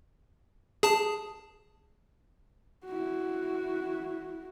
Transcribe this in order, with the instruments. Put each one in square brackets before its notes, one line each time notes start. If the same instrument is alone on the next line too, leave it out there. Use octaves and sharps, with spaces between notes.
[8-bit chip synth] G#4 A5
[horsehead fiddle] E4 F#4